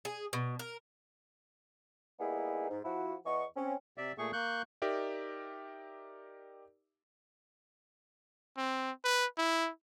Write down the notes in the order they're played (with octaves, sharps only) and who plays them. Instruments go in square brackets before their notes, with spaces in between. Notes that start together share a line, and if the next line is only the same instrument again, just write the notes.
[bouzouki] G#4
B2
A#4
[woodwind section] G3 A#3 B3 D#4 E4 G#4
G#2
F3 E4 F#4
E2 E3 B3 D#5 C#6
C4 C#4
[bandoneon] C3 D5 E5
A#2 A3 G#4 C#6
A#3 C#6 F#6 G6
[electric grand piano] D#4 G4 A#4 D5 E5
[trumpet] C4
B4
E4